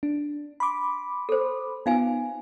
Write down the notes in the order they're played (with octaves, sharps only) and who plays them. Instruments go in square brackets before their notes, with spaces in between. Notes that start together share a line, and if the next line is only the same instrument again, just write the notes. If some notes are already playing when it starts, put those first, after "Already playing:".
[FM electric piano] D4
B5 C6 D6
[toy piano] A4 C5
[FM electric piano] B3 F4 [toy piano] D#4 F5 G#5